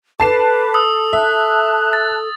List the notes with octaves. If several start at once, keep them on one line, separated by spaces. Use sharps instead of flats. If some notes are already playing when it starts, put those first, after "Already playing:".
A4 B4 A5 D6 C7 E7
D#6 E6
E5 A5 F#6
A6